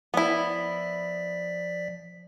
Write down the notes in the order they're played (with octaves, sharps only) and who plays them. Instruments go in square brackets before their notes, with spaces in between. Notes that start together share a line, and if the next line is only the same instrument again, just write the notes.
[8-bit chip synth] F3 D5 B6 [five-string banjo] B3 E4